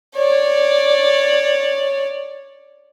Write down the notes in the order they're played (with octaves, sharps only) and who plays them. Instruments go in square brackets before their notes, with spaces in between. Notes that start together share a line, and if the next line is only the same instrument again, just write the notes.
[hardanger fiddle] C#5 D5